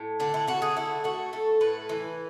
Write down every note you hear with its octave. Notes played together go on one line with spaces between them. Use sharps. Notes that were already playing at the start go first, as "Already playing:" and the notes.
Already playing: A2
D3 D4
E4
D3 F#4
G#4
A3 E4
A3 F#4
A3 A4
A2 B4
E3